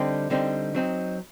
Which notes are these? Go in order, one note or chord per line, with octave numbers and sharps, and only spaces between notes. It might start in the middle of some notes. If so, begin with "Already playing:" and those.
Already playing: D3 G3 C4 D#4
D3 G3 C4 D#4
F#3 C4 D#4